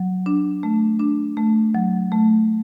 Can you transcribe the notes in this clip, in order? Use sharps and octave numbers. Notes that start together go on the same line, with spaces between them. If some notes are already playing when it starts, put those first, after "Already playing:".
Already playing: F#3
D4
A3
D4
A3
F#3
A3